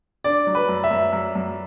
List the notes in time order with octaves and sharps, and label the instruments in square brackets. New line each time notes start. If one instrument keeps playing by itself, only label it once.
[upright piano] D4 [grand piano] D5
[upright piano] F#3
[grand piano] B4
[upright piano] F#2
[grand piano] E5
[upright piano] F#2
F#2
F#2